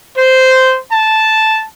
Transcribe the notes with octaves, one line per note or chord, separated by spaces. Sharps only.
C5
A5